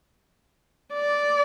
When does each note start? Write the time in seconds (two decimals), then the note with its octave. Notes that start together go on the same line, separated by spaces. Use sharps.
0.94 D5